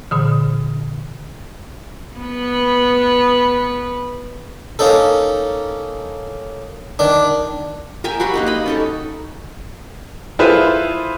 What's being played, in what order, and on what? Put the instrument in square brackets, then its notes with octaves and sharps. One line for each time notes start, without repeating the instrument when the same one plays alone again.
[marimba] A#2 D3 E3
[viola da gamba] B3 B4
[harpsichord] A#3 C#4 D#4 A4
D#3 D4
[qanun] A#4 E5 G5 G#5
F#4 G4 B5 C6
A#3 D#4 B4
D#5 B5
C#4 D#4 A4
[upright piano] E4 F4 G#4 A4 B4 C5